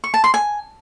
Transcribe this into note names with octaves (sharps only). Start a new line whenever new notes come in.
C#6
A5
C6
G#5